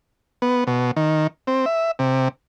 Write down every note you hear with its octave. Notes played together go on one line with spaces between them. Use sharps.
B3
B2
D#3
C4
E5
C3